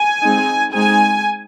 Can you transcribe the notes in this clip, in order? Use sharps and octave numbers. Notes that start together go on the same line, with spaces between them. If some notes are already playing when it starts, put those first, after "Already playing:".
Already playing: G#5
G#3 C4 D#4
G#3 C4 D#4 G#5